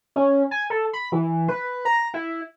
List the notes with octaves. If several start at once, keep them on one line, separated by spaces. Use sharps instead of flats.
C#4
G#5
A4
B5
E3
B4
A#5
E4